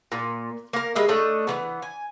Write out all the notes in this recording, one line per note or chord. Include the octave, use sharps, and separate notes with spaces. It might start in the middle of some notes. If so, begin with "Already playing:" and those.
A#2
A#3 A#4
G3 G#3 D#5 E5
A3 D4 C#5 D#5
E3 G3 B3
G#5